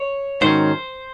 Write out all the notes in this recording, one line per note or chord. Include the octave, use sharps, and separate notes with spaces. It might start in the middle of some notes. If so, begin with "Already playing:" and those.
Already playing: C#5
G#2 D#3 F#3 C#4 C5